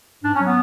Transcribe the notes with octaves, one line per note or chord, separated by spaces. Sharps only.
G#2 D4
C#4
F#3
B3